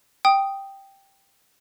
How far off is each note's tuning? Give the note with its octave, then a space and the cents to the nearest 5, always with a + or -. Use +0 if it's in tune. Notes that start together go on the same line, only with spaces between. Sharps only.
G5 +0 D#6 +0